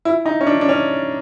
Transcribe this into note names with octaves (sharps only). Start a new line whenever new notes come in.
E4
D#4
C#4
D4
D4
C#4